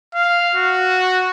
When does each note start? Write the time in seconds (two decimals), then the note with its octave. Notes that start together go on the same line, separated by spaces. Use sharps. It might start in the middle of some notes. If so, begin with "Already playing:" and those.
0.15 F5
0.55 F#4